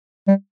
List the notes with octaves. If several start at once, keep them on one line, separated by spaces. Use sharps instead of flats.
G3